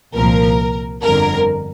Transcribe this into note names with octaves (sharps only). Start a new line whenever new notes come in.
C2 A#2 F3 A#4
G1 F2 D3 A#4